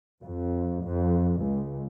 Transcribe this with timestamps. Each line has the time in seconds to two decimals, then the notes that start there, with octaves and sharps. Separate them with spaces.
0.24 F2
0.85 F2
1.43 C#2